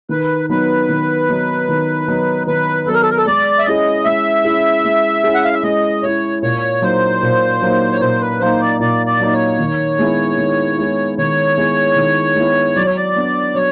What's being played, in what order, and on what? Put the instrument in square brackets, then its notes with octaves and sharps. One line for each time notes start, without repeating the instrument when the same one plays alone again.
[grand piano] D#3 [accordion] B4
[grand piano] F#3 B3 D#4 [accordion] B4
[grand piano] D#3
F#3 B3 D#4
D#3
F#3 B3 D#4
[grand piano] D#3 [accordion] B4
[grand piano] F#3 B3 D#4 [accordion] A4
[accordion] A#4
A4
A#4
A4
[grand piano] G#3 [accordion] D5
[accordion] E5
[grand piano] C#4 E4 G#4 [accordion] D#5
[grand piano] G#3 [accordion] E5
[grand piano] C#4 E4 G#4
G#3
C#4 E4 G#4
[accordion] F#5
F5
E5
[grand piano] G#3 [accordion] D#5
[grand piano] C#4 E4 G#4 [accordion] C#5
[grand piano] A#2 [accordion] C#5
[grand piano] F#3 A#3 D#4 [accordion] C5
[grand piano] A#2
F#3 A#3 D#4
[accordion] C#5
[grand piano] A#2 [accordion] C5
[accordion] B4
[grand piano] F#3 A#3 D#4 [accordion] C5
[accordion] D5
[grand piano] A#2 [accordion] D5
[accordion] D5
[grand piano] F#3 A#3 D#4
[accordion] C#5
[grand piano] D#3
G#3 B3 E4
D#3
G#3 B3 E4
[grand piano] D#3 [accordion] C#5
[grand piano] G#3 B3 E4
D#3
G#3 B3 E4
[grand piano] F#3 [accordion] D5
[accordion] C#5
D5
[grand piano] B3 D4
[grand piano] F#3 [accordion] C#5